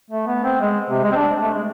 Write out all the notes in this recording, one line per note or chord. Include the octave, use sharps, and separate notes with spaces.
A3
B3
C4
G#3
C3
G#3
C4
D4
A3
G#3